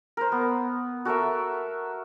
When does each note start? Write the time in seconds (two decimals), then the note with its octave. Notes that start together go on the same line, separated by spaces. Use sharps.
0.17 A#4 C5
0.32 B3
1.05 F#4 A4 A#4 E5